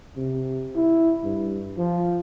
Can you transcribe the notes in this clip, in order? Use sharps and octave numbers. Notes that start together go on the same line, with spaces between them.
C3
E4
G2
F3